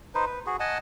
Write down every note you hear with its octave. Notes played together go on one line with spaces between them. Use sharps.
D#4 B4 C5
B4
F#4 G#4
D#5 F#5 G#5 A5